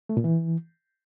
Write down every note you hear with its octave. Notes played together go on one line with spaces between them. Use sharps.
A3
A#2
E3